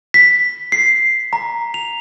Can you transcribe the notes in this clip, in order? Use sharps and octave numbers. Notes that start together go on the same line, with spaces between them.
B6
C7
A#5
F7